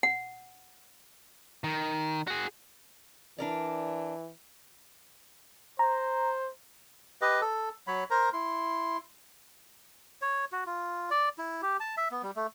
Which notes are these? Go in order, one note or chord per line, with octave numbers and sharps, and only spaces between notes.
F#5
D#3
F#4 G#4
E3 D4 A#4 D5
C5 A#5
G4 B4 D#5
A4
F#3 C#5 B5
A#4 C5 A#5
E4 C6
C#5
F#4
F4
D5
E4
G4
A5
E5
B3
G3
A3